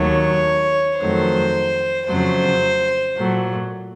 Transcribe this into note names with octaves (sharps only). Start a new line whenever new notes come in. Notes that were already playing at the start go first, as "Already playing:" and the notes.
Already playing: D#2 D#3 F#3 A3 C#5
F2 D#3 F#3 A3 C5
F2 C#3 F#3 A3 C5
A#2 F#3 A3